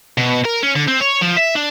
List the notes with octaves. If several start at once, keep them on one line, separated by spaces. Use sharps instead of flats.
B2
A#4
C#4
D3
C4
C#5
F3
E5
D4